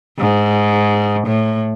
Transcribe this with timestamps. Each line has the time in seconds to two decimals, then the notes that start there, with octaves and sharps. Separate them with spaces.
0.19 G#2
1.27 A2